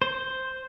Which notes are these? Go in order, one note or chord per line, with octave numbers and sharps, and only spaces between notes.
C5